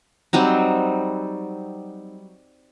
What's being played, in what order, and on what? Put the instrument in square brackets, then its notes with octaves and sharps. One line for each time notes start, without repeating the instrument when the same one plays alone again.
[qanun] F#3 G3 C4 D#4